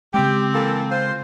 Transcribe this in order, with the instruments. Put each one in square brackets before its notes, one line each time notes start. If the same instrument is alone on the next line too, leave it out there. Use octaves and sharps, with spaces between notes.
[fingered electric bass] C#3 G#3 [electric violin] C4 [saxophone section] G4
[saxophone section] E3 A#3 A4
F4 C5